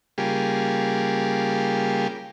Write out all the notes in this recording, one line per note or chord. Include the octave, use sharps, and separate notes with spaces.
C#3 G3 A#3 F4 G4 G#4